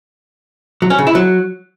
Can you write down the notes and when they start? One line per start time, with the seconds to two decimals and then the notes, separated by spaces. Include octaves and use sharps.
0.82 F#3
0.90 C#4
0.98 C#3
1.07 E4
1.15 F#3